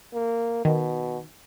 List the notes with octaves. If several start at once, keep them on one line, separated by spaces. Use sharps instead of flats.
A#3
B2 D#3